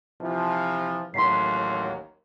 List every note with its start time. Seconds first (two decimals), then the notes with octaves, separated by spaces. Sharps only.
0.21 C3 E3 F3
1.14 A1 D#2 F#3 C6 B6 C7